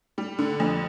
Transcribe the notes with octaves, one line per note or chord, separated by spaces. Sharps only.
G3
D3
F2